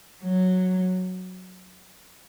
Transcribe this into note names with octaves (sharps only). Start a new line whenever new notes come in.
F#3